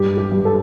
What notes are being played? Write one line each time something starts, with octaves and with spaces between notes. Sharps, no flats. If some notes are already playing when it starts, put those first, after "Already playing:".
Already playing: G2 G4
G4
G2
A4